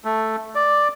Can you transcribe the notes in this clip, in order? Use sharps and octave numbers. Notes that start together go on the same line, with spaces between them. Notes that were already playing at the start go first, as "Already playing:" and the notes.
A3
D5